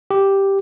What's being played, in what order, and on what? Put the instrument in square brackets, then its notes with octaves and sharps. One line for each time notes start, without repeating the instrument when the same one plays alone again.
[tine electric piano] G4